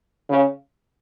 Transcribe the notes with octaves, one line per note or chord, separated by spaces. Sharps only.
C#3